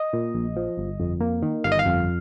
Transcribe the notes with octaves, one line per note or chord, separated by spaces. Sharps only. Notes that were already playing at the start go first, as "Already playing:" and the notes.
Already playing: D#5
A#2
A#1
F3
G1
F2
A#3
D#3
G1 F5
D#5
F5
F2